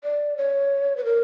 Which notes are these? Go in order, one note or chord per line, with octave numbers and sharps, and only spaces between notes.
D5
C#5
B4
A#4